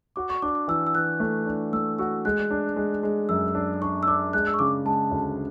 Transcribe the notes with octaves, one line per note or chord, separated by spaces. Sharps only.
F#4 D6
C#6
D4 D6
D6
E3 E6
E6
E3 F#6
A3
D4
A3 E6
F#4 E6
G#3 F#6
D4
G#3
G#3
F#2 E6
D4
D4 C#6
E6
D4 D6
G#3 F#6
E6
C#6
C#3 D6
G#3 A5
D2